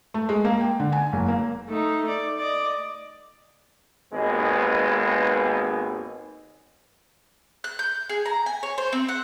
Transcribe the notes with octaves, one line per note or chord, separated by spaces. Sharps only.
A3
G#3
A#3
G5
D3
G#5
F#1
A#3
A3 D#4
D5
D5 D#5
G#1 D#2 G#3 B3 B4
F#6
G6
G#4
A#5
G#5
C#5
C5
C4
F#5